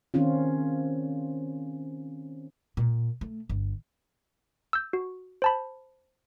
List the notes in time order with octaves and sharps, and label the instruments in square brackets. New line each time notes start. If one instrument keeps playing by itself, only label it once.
[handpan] D#3 C4 C#4 F4
[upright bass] A#2
A3
G1
[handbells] E6 G6
F#4
C5 A5 B5